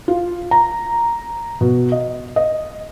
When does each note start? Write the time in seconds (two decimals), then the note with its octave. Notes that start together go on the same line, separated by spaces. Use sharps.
0.08 F4
0.51 A#5
1.61 B2
1.92 D#5
2.36 D#5